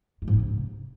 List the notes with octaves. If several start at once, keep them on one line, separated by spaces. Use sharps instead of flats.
G#3
G#2
C#4
C3